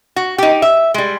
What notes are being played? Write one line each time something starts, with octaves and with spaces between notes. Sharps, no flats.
F#4
D#4 G4
E5
G3 G#3